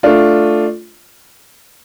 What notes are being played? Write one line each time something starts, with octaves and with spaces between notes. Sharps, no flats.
A3 D4 F4